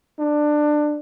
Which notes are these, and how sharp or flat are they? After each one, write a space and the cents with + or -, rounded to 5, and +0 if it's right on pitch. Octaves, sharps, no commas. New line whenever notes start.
D4 +20